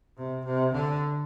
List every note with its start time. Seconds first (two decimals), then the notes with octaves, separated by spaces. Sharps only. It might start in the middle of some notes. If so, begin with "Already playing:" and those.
0.17 C3
0.45 C3
0.73 D3